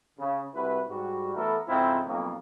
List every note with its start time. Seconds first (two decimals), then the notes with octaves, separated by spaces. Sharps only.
0.19 C#3
0.54 C2 E4 F#4 B4
0.88 G#2 G3 F#4
1.35 E3 A3 B3 A4 A#4
1.67 F2 G#2 C#3 C4 E4 F4
2.06 B1 F2 A#3